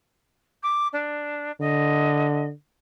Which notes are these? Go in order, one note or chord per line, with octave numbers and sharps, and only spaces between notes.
D6
D4
D3 D#5